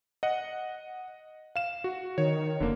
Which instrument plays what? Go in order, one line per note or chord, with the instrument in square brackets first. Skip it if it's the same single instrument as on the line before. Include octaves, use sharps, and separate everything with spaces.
[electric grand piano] D#5 F#5
F5 E7
F#4
[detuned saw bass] D#3 [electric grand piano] C#5
[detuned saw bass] F1 [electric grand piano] D3 A#3